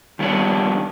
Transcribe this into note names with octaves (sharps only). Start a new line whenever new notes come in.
D#3 G3 B3 D4 C#5